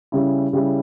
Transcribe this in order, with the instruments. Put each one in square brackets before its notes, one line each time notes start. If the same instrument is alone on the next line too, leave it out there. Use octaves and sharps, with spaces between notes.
[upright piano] C#3 G3 C#4 E4
C#3 G3 C#4 E4